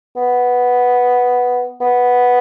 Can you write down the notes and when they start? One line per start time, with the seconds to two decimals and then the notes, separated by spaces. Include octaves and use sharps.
0.16 B3
1.81 B3